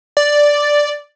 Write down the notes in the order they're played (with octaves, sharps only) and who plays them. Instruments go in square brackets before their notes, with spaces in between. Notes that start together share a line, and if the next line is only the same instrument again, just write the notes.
[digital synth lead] D5